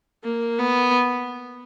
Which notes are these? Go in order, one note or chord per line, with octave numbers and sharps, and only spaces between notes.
A#3
B3